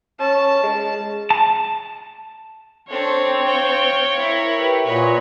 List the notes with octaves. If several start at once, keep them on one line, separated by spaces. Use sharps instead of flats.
C#4 A5
G#3
A5
C4 D4 A4 C5 C#5
F5 G5
E4 A#4
G4 B4
A#2 F#4 B4 C#5 D#5